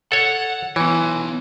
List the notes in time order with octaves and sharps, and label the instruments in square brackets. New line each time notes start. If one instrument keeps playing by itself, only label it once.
[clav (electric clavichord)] A4 C#5 [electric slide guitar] F#5
[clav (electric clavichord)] E3 [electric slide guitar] B3 C#5